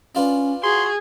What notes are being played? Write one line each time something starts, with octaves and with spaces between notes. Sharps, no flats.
C#4 D4 F4 B4
F#4 G#4 C6